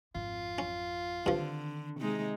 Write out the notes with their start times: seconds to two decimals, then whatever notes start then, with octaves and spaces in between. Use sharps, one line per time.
0.15 G#1 F2 F4
0.58 C#4
1.26 G2 D3 D#3 F3 C4
2.00 C3 G#3 D#4